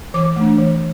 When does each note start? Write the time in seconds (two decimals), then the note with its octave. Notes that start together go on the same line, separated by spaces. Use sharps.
0.14 E3 D6
0.36 A3 D4
0.59 E3